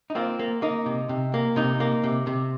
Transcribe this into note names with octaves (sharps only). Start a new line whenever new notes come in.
D#4
A#3 C4 F4
A#3
A#3 D#4
C3
C3
A#3
C3 D#4
A#3
C3
C3